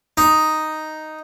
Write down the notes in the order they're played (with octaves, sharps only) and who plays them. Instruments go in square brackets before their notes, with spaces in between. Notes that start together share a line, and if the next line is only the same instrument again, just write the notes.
[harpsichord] D#4